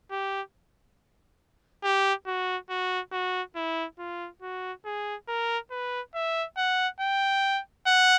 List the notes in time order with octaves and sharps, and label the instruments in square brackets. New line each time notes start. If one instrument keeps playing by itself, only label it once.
[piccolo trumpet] G4
G4
F#4
F#4
F#4
E4
F4
F#4
G#4
A#4
B4
E5
F#5
G5
F#5